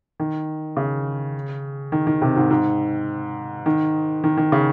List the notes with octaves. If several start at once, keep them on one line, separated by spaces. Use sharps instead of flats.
D#3
C#3
D#3
D#3
C3
G#2
G#2
D#3
D#3
D#3
C#3